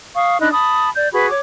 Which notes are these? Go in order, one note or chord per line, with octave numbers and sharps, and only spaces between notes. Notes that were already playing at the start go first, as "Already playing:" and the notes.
F5 C#6 D#6
D4 D#4 B5 F#6
A5 B5 D#6
D5 G6
F#4 G#4 B4 B5
C#5 D6